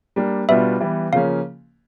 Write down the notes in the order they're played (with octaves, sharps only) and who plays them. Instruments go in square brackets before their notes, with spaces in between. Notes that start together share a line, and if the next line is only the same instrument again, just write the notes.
[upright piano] G3 A#3 D4
[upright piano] B2 G3 B3 D4 F4 [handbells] E5
[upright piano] E3 G3 B3
[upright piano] C#3 F3 A#3 C#4 [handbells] F5